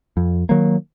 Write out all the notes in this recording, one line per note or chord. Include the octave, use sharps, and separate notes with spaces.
F2
D#3 F#3 A#3